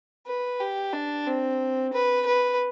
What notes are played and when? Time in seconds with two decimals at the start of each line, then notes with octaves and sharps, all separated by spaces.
0.27 B4
0.60 G4
0.94 D4
1.27 C4
1.93 B4
2.26 B4